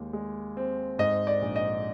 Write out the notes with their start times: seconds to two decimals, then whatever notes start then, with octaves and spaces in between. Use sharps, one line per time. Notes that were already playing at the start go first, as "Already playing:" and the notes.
Already playing: D#2 G#3
0.13 G#3
0.57 C4
0.99 G#2 D#5
1.27 D5
1.42 A#1
1.56 D#5